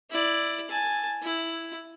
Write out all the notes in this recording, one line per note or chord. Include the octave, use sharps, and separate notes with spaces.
E4 D5
G#5 A5
E4